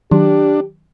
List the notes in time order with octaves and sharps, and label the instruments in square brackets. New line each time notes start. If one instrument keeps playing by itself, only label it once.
[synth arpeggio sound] D#3 F#3 [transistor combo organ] D4 [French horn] G4